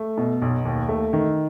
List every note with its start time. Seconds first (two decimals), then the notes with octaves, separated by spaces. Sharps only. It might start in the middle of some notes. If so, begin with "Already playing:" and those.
Already playing: A3
0.18 B2
0.42 B1
0.65 D#2
0.89 A3
1.13 D#3